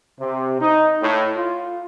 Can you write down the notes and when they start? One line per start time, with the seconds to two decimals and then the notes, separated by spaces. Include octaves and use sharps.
0.20 C3
0.61 D#4
1.03 A2
1.36 F4